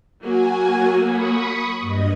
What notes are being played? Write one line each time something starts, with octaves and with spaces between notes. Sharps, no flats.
F#3 A#3 F#4 G#5
B5 C#6 D#6
G2 D#5